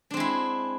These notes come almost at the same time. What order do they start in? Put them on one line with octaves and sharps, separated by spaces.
D4 C4 G#3 E4